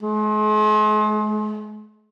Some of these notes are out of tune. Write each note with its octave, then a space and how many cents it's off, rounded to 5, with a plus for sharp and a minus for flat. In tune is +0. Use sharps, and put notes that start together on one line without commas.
G#3 +40